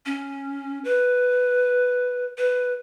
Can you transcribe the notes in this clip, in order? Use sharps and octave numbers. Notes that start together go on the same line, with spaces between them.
C#4
B4
B4